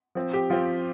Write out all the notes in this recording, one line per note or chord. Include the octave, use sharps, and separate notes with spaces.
F3 C4
G4
F3 C4 F4